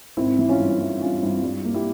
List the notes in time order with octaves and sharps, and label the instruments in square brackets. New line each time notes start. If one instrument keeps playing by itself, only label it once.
[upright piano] G#1 [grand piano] C4 E4
[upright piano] E3
[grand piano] C#4 F4
[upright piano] G2
E3
[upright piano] G2 [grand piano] C#4 F4
[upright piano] G2 [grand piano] C4 E4
[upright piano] G3
A#3
[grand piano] E4 G4